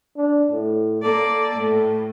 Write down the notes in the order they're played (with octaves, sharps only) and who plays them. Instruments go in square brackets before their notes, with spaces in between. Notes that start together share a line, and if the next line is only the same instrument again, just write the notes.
[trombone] D4
A2
[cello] A#3 D5 [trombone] A4
[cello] A2